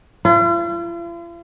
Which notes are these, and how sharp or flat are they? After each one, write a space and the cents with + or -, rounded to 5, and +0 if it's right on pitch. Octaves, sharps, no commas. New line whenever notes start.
F4 -45